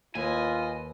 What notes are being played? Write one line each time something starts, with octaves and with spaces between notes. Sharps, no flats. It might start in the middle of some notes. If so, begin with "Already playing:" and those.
D#2 F4 B4 D#5 G#5